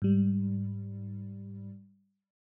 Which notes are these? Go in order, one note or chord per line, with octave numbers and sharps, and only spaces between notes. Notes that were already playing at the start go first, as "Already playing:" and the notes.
G#2 G3